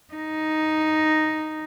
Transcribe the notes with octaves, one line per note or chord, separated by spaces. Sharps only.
D#4